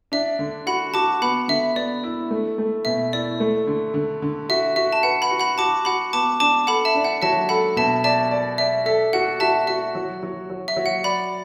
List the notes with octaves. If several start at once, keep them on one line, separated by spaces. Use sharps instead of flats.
D4 E5
D3
F#4 F#5 B5
F#4 A5 D6
B3 F#5 B5
D3 E5
B3 D5
E4
A3
A3
B2 E5
E4 D5
A3
D3
D3
D3
F#4 E5
F#4 E5
A5
B4 F#5
F#5 B5
F#4
F#5 B5
F#4 A5 D6
F#4 F#5 B5
B3 A5 D6
D4 A5 D6
A4 F#5 B5
E5 A5
D4
F#5
F#3 E5 A5
A4 F#5 B5
B2 E5 A5
D5 E5 A5
D5
D5 E5
A4 E5
F#4 F#5
F#4 E5 A5
F#4 E5
F#3
F#3
F#3
E5
F#3
F#5
D5 F#5 B5